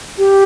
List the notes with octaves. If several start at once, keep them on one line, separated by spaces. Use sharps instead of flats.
G4